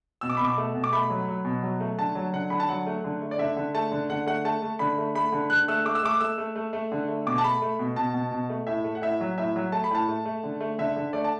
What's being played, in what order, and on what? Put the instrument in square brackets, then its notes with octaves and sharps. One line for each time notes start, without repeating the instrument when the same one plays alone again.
[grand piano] B2 E6
D6
B5
B2 D6
A3
B2
D6
A3 B5
F#3
F#3
B2
F#3
A3
D3 A5
F#3
D3 F#5
D3 B5
A5
F#3 F#5
A3
D3
A3
D5
D3 E5
D3
A3 A5
D3
D3 F#5
A3 F#5
A3 A5
A3
D3 B5
A3
A3 B5
D3
D3 F#6
A3 E6
A3 D6
E6
A3 D6
A3 E6
A3
A3
A3
D3
A3
B2 D6
A5
A3 B5
A3
B2
B2 A5
B2
B2
A3
A2 E5
A3
F#5
A2 E5
F#3
A2 E5
F#3
A3 A5
B5
A2 A5
A3
A3
D3
A3
D3 E5
D3
A3 D5
A5